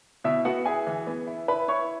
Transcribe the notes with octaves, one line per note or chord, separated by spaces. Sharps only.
B2 E4 E5
B3 F#4 F#5
E4 G#4 G#5
E3
B3
E4
E4 B4 B5
E4 C#5 C#6